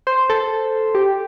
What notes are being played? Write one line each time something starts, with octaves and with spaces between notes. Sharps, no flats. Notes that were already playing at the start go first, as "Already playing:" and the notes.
C5
A4
G4